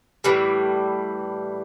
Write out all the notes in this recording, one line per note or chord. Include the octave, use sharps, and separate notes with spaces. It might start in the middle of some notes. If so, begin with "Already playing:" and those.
A2 E3 G3